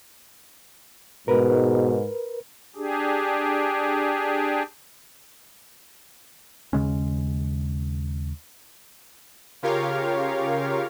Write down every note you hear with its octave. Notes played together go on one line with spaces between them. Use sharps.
G#2 B2 A#4 B4
D4 G4 G#4
D#2 C#3 G#3 C#4
C#3 F4 G4 A#4 C#5 F5